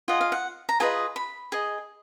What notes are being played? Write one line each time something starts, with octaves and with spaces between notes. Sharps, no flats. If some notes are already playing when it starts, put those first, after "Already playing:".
F4 G#4 D#5 F#5
F5
F#5
A#5
F4 G#4 B4 D#5 G#5
B5
G#4 D#5